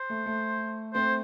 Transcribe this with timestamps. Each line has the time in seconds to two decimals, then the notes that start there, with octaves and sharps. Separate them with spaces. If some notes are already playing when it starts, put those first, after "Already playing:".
Already playing: C5
0.10 A3
0.26 A3
0.94 A3 C4 C5